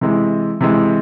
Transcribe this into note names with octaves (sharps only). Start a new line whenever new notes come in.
C3 E3 G#3
C3 E3 G#3